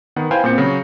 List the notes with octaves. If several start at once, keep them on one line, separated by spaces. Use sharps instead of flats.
D#3 B3 F#5
E4 B4 C5 F5 G5 G#5
A#2 B3 C4 G6 C#7
C#3 F#3 F#4 F#5